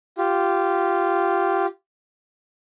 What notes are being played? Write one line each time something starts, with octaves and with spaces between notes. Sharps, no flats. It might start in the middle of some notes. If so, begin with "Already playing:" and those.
F4 G4